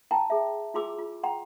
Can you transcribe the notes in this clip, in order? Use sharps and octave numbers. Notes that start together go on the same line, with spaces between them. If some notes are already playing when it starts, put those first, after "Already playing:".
E4 G5 A5 A#5
G#4 E5
E4 F4 G#4 C6 D6 E6
F4
F#5 G5 A#5 C6